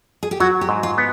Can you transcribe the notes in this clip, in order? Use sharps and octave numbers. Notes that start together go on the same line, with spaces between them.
G#4
G4
F#3 F#4
G4
G#2
F4
B3